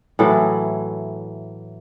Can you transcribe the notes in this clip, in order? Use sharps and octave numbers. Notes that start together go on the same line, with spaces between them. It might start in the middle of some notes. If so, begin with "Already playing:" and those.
A2 E3 F#3 A4